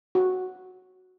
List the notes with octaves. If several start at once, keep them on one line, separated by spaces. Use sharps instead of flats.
F#4